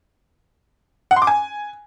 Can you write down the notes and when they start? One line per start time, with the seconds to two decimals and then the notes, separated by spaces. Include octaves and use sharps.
1.11 F#5
1.16 C6
1.22 D6
1.27 G#5